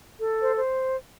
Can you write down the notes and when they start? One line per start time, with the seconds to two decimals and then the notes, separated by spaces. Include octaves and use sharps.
0.21 A4
0.40 C5
0.57 C5